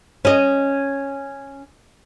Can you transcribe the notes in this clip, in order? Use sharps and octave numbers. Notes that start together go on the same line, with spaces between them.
C#4 D#5